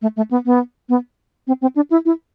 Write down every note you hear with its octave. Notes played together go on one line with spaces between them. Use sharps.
A3
A3
B3
B3
B3
C4
C4
D4
E4
E4